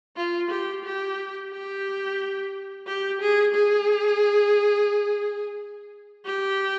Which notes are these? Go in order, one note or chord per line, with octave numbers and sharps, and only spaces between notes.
F4
G4
G4
G4
G4
G#4
G#4
G4